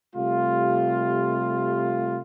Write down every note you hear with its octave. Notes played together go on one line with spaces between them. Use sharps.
C3 G3 A3 F4